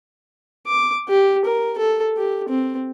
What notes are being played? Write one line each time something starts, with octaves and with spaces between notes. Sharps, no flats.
D6
G4
A#4
A4
G4
C4